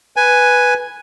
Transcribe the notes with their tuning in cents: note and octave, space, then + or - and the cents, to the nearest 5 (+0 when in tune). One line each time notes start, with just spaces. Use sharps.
B4 +0 G#5 +0